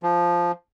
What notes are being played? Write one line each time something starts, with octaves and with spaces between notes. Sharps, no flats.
F3